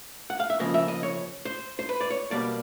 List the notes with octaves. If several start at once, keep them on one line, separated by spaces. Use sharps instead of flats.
F#5
F5
E5
C#3 F3 A#3 D#5
E5
D#5
C#5
C5
C5
B4
D5
C#5
B2 G3 A#3 D5